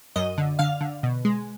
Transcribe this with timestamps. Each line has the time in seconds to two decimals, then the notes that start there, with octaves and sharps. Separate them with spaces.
0.16 F#2 D#5
0.38 D3
0.59 D3 F5
0.81 D3
1.03 B2
1.25 G#3